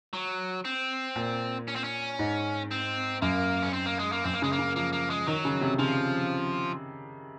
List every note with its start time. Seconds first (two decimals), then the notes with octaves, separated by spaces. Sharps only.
0.13 F#3
0.65 C4
1.16 A#2
1.68 C#4
1.76 C4
1.84 C#4
2.19 G#2
2.71 C4
3.22 F#2 A#3
3.63 C#4
3.73 C4
3.86 A#3
3.99 G#3
4.12 A#3
4.24 F#2 C4
4.34 A#3
4.42 C#3 G#3
4.52 A#3
4.59 C#3
4.75 F3 A#3
4.93 A#3
5.10 G#3
5.27 D#3 F#3
5.45 C#3
5.61 C3
5.79 C#3 F3